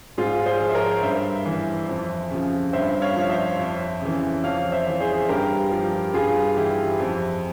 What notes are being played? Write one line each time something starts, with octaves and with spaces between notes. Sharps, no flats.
G#2 F4 G#4
G#4 C5
F3
E5
A#4 C#5
G2 C5 E5
E3
F2
C#3 F3
G2 C5 E5
C#5 F5
F3
C5 E5
F2
C#3 E3
F2 C#5 F5
C5 E5
E3
G#4 C5
G2 G4 A#4
F3
G2 F4 G#4
E3 E4 G4
F2